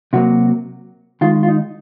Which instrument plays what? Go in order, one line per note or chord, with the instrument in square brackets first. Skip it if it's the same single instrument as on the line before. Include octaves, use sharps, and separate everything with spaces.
[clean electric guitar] C3 F#3 A#3 F#4
D#3 G#3 F4
F4
D#4